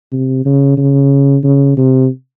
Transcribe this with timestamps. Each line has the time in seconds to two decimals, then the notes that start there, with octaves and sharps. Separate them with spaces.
0.12 C3
0.45 C#3
0.77 C#3
1.44 C#3
1.77 C3